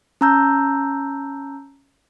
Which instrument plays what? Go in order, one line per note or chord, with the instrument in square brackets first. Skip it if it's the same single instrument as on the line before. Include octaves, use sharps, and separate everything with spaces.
[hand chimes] C#4 A5 A#5 E6 G6